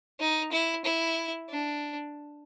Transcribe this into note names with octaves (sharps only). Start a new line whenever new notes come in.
D#4
E4
E4
D4